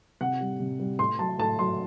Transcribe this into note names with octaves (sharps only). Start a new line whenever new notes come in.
C3 F#5
G3
C3
G3
A2 C6
F#3 A5
A2 A5
F#3 C6